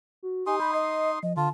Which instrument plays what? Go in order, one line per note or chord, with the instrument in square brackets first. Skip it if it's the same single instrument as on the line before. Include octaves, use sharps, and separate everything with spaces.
[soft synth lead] F#4
[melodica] D#4 C6 D#6 [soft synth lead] G4 [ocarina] G#5
[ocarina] B5 [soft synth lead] G6
[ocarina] D#5 [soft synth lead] C7
[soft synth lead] F3 [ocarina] D#5
[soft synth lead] D3 [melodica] F4 [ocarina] A5